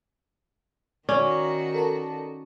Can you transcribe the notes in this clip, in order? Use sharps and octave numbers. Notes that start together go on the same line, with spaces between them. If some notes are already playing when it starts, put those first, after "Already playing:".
D#3 C#4 D#4 F#4 D5
A4 A#4 A5